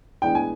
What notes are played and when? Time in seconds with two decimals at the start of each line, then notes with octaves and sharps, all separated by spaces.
0.22 A2 E3 G#3 B3 D4 G5
0.35 G#5